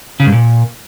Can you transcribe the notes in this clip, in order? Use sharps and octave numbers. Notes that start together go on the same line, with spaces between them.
C#3
G2
A#2